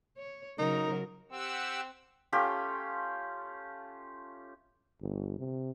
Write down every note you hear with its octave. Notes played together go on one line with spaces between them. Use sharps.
C#5
C#3 F#3 D#4 A#4
C4 G4 F#5 E6
A3 C#4 F4 G4
G1
C3